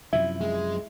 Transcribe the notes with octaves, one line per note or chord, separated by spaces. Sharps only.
F#2 C3 F3 E4 E5
G#3